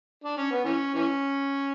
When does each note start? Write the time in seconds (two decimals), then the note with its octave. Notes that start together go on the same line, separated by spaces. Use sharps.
0.24 D4
0.38 C#4
0.52 B3
0.65 E3 C#4
0.95 E3 C#4